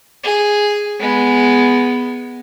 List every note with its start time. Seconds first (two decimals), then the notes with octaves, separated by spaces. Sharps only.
0.24 G#4
1.00 G#3 B3